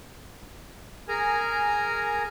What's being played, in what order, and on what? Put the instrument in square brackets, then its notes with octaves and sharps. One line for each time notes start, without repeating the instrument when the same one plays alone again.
[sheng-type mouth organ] G#4 A#4 G#5 A#5